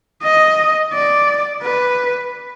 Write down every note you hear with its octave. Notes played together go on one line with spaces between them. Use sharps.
D#5
D5
B4